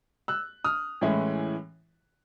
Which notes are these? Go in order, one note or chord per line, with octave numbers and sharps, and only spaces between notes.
E6 F#6
D#6 F6
A2 E3 G#3 C#4 E4